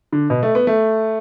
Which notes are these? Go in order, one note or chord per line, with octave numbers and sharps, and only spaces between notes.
D3
B2
A3
B3
A3